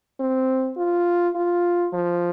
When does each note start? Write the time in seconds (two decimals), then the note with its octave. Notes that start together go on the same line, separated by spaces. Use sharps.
0.20 C4
0.77 F4
1.36 F4
1.94 F3